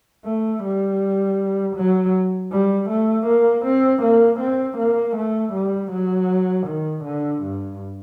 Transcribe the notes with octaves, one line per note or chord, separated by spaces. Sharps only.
A3
G3
F#3
G3
A3
A#3
C4
A#3
C4
A#3
A3
G3
F#3
D#3
D3
G2